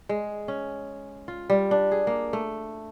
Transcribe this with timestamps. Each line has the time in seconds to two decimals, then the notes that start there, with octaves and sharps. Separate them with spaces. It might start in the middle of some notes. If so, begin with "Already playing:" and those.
0.09 G#3
0.48 C#4
1.28 F4
1.50 G3
1.71 D4
1.91 G#4
2.07 A#3
2.33 A3